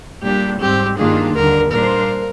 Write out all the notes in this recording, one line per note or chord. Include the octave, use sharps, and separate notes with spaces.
A#2 G3 D4 G4
G#2 G3 C4 G4
G2 D#3 A#3 D4 F4 G#4
D#2 D3 G3 A#4
A#2 G3 D4 F4 A#4 C5